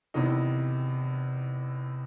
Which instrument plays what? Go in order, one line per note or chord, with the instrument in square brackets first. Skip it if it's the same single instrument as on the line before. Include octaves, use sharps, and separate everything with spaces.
[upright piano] E2 C3 D#3 D#4
E4
D#4